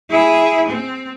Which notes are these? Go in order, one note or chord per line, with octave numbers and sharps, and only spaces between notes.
E4 G#4
C4